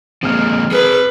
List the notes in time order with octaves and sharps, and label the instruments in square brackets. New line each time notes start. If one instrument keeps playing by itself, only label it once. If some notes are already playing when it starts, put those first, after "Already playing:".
[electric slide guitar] F3 G#3 A#3 [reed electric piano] C4 F6
[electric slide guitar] G#4 A#4 [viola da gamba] B4